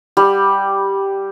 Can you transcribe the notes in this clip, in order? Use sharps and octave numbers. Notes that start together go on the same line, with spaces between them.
G3